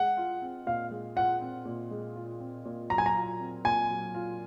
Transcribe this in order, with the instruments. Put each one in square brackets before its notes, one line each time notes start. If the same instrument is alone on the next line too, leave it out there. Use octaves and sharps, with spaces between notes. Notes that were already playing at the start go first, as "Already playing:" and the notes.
Already playing: [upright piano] G#3 [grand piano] F#5
[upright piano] F4
C4
[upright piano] A#2 [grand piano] F5
[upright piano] G#3
[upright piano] F4 [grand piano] F#5
[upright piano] C4
A#2
G#3
F4
C4
A#2
[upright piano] F#3 [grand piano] A#5
[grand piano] G#5
A#5
[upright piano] F4
C4
[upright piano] A#2 [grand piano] G#5
[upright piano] F#3
F4